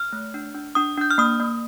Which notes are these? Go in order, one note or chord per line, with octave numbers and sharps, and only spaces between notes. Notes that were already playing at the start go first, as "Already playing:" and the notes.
Already playing: F6
A3
D4
D4
D4 D#6
D4 G6
F6
A#3 D#6
A#3